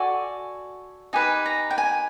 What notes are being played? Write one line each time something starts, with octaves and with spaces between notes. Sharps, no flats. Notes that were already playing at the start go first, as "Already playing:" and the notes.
Already playing: F#4 A4 D5 G#5
D#4 G4 B4 G#5
A#5
G5
G#5